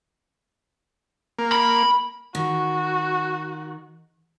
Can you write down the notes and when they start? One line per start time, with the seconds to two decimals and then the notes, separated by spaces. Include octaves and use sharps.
1.39 A#3
1.52 B5
2.35 D#3 F#4